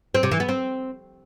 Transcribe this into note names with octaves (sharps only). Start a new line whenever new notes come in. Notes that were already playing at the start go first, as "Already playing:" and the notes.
C4
C3
E3
B3
C4